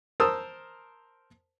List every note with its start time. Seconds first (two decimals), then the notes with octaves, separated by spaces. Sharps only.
0.20 A#4 C5 A5 D#6 E6